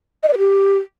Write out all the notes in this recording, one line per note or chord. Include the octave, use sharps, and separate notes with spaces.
D#5
D5
B4
G4